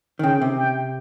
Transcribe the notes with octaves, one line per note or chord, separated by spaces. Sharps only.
D#3
C#3 G5
C3
G5